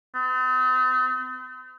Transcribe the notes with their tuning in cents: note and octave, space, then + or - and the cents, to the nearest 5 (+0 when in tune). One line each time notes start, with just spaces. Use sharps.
C4 -45